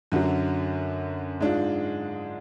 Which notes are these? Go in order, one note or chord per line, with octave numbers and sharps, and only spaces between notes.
F#2 D3 F#3
G#2 G#3 D4 F4